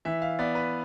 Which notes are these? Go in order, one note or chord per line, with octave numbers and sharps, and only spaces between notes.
E3 E5
F5
B3 D5
B4